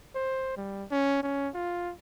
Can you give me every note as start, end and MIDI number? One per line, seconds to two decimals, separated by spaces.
0.15 0.55 72
0.57 0.85 55
0.91 1.23 61
1.23 1.49 61
1.54 1.93 65